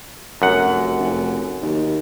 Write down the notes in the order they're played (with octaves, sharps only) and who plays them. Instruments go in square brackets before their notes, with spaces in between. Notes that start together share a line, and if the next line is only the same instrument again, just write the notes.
[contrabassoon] F1 [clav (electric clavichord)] F#2 F#5
[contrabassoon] F1
D#2